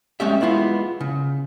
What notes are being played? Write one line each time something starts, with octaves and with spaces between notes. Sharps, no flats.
G#3 A3 C#4 G4 E5
G#3 B3 E4 F4
C#3